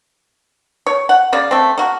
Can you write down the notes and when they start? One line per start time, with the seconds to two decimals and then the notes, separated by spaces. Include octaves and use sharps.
0.86 C#5
1.09 F#5
1.33 C#3 A#3 D5
1.51 A3 C4
1.78 A#3 F#4